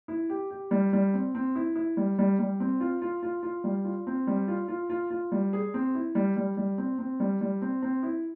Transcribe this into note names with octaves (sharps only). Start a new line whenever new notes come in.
E4
G4
G4
G3
G3
C4
C4
E4
E4
G3
G3
G3
C4
F4
F4
F4
F4
G3
F4
C4
G3
F4
F4
F4
F4
G3
G#4
C4
E4
G3
G3
G3
C4
C4
G3
G3
C4
C4
E4